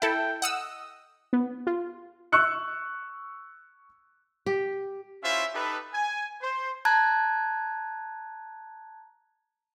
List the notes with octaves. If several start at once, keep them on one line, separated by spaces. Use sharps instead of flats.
E4 A4 G5
D#5 F#5 D#6 E6
B3
F4
C#6 E6 F#6 C#7
G4
C#4 E4 F4 C5 E5
D#4 G4 A4 B4
G#5
C5
A5 A#5 F#6 G#6